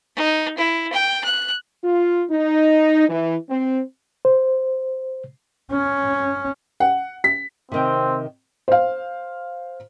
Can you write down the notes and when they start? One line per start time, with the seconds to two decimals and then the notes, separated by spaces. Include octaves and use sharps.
0.16 D#4
0.57 E4
0.92 G5
1.24 F#6
1.84 F4
2.31 D#4
3.09 E3
3.50 C4
4.25 C5
5.72 C#4
6.80 F#5
7.24 B6
7.72 C3 D#3 C4 G5
8.68 C5 F5